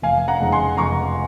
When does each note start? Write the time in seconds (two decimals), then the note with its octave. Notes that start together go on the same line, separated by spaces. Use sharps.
0.02 F1 F5 G#5
0.28 F#5 A#5
0.41 F2 C#3 G#3 D#4
0.52 G#5 C6
0.77 F1 A#5 C#6